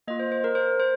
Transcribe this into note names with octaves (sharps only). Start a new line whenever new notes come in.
A#3 F4 D#5
C5
C5
A#4
C5
C5